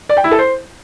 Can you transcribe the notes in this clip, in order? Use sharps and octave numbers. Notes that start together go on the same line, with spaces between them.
D5
G5
E4
A4
C5